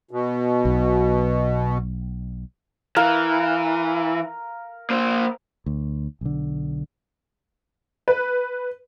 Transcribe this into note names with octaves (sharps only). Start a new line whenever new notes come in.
B2
B1
E3 A#4 F5
A#3 C5
D2
B1 D3
B4